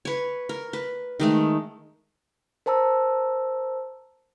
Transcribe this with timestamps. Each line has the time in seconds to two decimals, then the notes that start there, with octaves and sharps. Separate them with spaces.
0.05 B4 C#5
0.49 A#4
0.73 B4
1.20 D#3 G#3 A3
2.66 A#4 C5 A5 A#5 E6